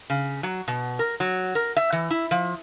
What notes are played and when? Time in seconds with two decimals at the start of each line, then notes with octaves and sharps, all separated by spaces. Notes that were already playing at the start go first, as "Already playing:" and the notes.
0.10 C#3
0.43 F#3
0.68 B2
0.99 A#4
1.20 F#3
1.55 A#4
1.77 E5
1.92 E3
2.11 E4
2.31 F3